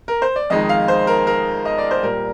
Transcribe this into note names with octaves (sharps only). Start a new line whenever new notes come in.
A#4
C5
D5
F2 D#3 G#3 D#5
F5
C5
A#4
A#4
D#5
D5
C5
A#2 G3 A#4